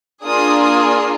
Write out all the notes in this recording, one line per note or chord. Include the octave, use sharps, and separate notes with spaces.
A#3 D4 F4 G#4 D#6
D#6